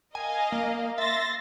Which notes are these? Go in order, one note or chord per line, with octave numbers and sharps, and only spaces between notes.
A#4 D#5 F5 G#5
A#3
E5 C6 A6 A#6